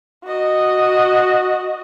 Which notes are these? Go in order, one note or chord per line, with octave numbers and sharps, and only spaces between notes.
F#4 D#5